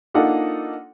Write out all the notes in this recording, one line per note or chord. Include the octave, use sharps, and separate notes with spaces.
A#3 D4 D#4 F4 A4 F#5